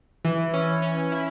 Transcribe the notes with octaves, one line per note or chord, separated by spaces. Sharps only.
E3
C#4
C#4
E4